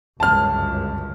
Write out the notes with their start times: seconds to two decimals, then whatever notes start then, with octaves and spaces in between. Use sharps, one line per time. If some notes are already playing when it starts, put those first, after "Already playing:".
0.20 G1 C#2 F#2 A5 F6